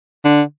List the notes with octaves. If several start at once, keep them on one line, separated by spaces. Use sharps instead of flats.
D3